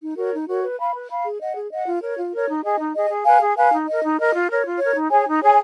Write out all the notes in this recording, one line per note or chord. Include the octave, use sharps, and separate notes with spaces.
D#4
F#4 A#4 C#5
D#4
F#4 A#4 C#5
B4
F5 B5
B4
F5 B5
G#4
D#5 F#5
G#4
D#5 F#5
F4
A#4 C#5
F4
A#4 C#5
D#4
G#4 D#5
D#4
G#4 D#5
G#4
B4 F5 G#5
G#4
B4 F5 G#5
D#4
A#4 D#5
D#4
A#4 D#5
F4
A#4 C#5
F4
A#4 C#5
D#4
G#4 C#5 G#5
D#4
G#4 C#5 G#5